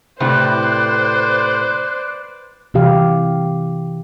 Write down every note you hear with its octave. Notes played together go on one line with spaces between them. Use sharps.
A2 C3 B4 C5 D5 F#6
C3 E3 G4 F5